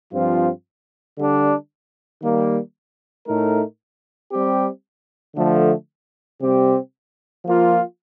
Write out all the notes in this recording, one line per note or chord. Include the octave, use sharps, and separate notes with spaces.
G2 F3 C4 F4
D3 G3 D4
D#3 G3 A#3
A2 A3 D#4 A#4
G3 C4 G4
D3 F3 A3
C3 G3 C4 G4
F3 A#3 F4